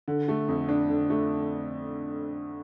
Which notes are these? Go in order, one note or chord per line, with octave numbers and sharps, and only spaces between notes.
D3
A3
F2
D4
D3
A3